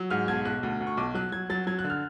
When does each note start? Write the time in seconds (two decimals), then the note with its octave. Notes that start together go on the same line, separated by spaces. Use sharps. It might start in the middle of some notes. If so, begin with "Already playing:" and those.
Already playing: F#3
0.10 G#2 F6
0.28 B1 G#6
0.45 B1 F#6
0.63 D2
0.81 D2
0.87 C#6
0.97 B1 D6
1.15 F#3 F#6
1.32 F#3 G#6
1.50 F#3 A6
1.67 F#3 G#6
1.79 F#6
1.84 D3
1.90 F6